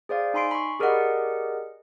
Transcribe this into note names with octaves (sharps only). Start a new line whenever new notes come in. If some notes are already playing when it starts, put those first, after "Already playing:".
G#4 C5 D5 F5
D#4 G#5 B5 C6 C7 D7
B5 C#6
G4 G#4 A#4 D5 D#5 F#5